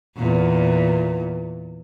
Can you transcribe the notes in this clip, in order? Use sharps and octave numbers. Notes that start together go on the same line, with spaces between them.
E2 A#2